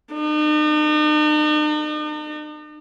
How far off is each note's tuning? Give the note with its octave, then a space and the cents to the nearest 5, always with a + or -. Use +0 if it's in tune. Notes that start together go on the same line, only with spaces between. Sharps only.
D#4 -45